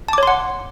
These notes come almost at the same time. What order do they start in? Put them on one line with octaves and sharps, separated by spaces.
A5 D6 C#5 C6 F#5